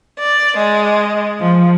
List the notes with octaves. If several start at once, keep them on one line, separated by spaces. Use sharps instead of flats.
D5
G#3
F3